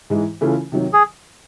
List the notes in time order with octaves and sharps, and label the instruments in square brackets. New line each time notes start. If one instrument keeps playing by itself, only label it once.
[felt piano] G#2 E3 G#3
C#3 E3 A3 C#4 F4
C3 D#3 F#3
[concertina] G#4